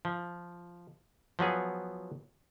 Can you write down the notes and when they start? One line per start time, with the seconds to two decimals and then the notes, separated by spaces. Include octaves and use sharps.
0.05 F3
1.39 F3 F#3 B3 G#4